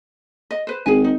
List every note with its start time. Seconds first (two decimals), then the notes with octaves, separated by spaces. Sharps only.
0.51 D#5
0.67 B4 C5
0.86 G#1 G#4 G#5
1.04 D#4